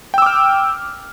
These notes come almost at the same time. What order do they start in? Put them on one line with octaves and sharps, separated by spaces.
G5 E6 D6 F6